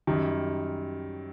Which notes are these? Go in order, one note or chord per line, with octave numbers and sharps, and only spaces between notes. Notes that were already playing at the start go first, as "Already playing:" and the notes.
F#2 D#3 G3